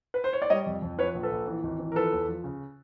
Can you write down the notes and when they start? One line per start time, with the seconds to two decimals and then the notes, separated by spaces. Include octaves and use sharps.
0.14 B4
0.24 C5
0.33 C#5
0.42 D5
0.50 G3 C#5 D#5
0.66 F2
0.82 F2
0.98 F3 B4 C#5
1.14 A#1
1.23 A4 B4
1.31 A#1
1.47 E3
1.63 G#1
1.80 E3
1.92 A#4
1.95 F3 A4 B4
2.12 E2
2.28 F3
2.44 C#3